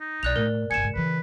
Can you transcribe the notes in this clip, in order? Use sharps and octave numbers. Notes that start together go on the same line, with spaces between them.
D#4
B1 D5 F#6 F7
A2 A#4
G1 C#3 G#5 C#7 E7
G#2 C#3
C#3 E3 B4